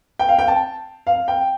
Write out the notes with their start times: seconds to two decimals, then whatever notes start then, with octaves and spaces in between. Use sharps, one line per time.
0.19 G5
0.29 F5
0.39 G5
0.48 A5
1.07 F5
1.28 G5